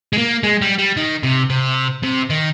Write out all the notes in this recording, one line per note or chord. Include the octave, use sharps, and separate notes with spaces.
G#3
A#3
G#3
G3
G3
D#3
C3
C3
C3
D#3